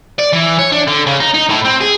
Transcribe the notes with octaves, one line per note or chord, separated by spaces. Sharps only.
D5
E3
C#5
D4
D3
C#3
D#4
D#4
A2
C4
G#4